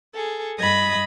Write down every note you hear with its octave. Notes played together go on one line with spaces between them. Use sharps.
G#4 A4
G2 D#5 B5 D#6 G#6